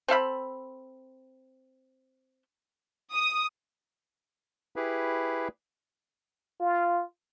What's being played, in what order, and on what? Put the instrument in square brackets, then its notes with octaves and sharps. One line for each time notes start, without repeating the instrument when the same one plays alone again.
[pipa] C4 A4 F5 B5
[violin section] D#6
[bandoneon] E4 G4 G#4 B4
[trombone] F4